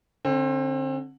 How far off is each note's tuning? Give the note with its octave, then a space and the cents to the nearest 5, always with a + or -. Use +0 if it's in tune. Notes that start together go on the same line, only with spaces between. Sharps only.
D3 +0 C4 +30